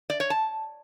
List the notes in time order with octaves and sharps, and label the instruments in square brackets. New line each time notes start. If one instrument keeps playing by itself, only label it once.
[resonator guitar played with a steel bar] D5
C#5
A5